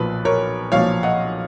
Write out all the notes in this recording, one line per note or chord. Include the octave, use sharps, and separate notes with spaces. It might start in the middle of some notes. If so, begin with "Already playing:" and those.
Already playing: B1 A#2 F3 B4
A#4 C#5
B1 A#2 F3 C#5 F5
D#5 F#5